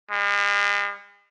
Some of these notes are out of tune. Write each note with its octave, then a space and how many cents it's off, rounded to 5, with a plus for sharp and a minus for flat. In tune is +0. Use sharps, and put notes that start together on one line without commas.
G#3 -45